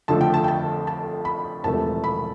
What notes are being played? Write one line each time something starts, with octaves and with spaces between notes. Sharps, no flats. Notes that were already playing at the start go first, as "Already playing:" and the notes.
F2 D3 F3 A3 A5
G5
A5
G5
A5
A5
B5
E1 E2 C3 F3 A3 A5
B5